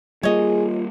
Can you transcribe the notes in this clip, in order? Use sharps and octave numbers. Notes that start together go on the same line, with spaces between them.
G3 A#3 F4 G#4 C#5 D#5